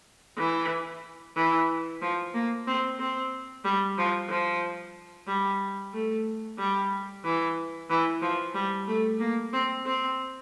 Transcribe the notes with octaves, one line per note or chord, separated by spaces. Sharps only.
E3
E3
F3
A#3
C4
C4
G3
F3
F3
G3
A3
G3
E3
E3
F3
G3
A3
A#3
C4
C4